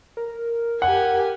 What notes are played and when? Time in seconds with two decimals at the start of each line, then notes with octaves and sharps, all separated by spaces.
0.17 A#4
0.82 G4 F#5 G#5